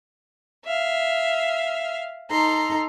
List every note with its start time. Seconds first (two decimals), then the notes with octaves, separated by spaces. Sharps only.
0.65 E5 F5
2.30 D#4 A4 A#5 C6